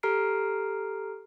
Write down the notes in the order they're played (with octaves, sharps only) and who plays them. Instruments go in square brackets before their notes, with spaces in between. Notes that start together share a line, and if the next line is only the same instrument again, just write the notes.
[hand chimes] G4 A4 A#5 F6 C7 D7